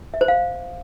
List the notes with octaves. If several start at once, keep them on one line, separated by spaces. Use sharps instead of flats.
E5
C5
F5